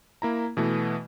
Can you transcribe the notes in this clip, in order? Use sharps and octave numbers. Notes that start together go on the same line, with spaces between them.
A#3 E4 A#5
B2 E3 A3